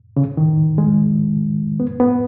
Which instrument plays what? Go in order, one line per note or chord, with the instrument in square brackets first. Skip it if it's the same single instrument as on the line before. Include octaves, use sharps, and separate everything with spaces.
[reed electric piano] C#3
D#3
G#3
B3
B3